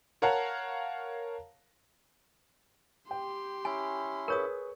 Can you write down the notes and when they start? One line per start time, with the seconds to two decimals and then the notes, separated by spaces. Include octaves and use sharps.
0.22 A#4 C#5 F5 F#5 A5 A#5
3.11 G4 G5 C6
3.65 C#4 E4 G#5
4.28 G#4 A#4 B4 C#5 C#6 D#6